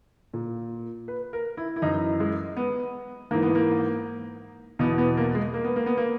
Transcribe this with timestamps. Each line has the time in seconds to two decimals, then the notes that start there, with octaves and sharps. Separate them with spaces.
0.34 A#2
1.08 B4
1.33 A#4
1.57 E4
1.76 E4
1.82 F#2 E3 D#4
2.20 G#3
2.57 B3
3.31 G#2 E3 A#3
3.42 B3
3.55 A#3
4.79 E2 B2 B3
4.98 B3
5.17 A#3
5.35 G#3
5.54 A#3
5.64 B3
5.76 A#3
5.86 B3
5.97 A#3